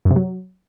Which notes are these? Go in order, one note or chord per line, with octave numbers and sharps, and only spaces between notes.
F#2
C3
F#3